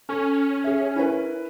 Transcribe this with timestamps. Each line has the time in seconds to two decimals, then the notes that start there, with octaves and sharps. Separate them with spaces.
0.09 C#4 A4
0.64 G#4 E5
0.96 E4 A#4 B4